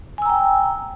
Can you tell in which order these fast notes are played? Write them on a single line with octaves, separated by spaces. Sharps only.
G#5 E6 A#5 G5